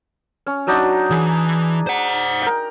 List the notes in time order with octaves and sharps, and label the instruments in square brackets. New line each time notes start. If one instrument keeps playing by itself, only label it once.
[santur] C#4
F#3 D4 D#4
[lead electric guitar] E3 E4 [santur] G#4
[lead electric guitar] C5 F#5
[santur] A#4 G5